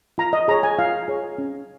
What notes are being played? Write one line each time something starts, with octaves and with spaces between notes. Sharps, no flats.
F4 A#5
D#5
G#4 C#5 A#5
G#5
F4 F5
G#4 C#5
C#4